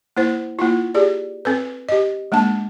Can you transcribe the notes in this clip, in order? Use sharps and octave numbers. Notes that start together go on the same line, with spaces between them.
A#3 E4 C5
A#3 E4 F4
G4 G#4 D5
C4 A4 B4
G4 D#5
G#3 A#3 D4 A5